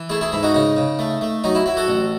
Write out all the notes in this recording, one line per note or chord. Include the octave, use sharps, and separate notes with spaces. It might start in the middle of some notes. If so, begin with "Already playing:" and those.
Already playing: E3
A3 E4 G#4
E4 G#4
G#2 E4
D#4 F#4
C#3 D#4
C#3
A3
A3
F#3 D#4
E4
F#3 E4
F#4 A4
A1